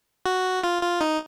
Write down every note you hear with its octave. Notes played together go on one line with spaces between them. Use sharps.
F#4
F4
F4
D#4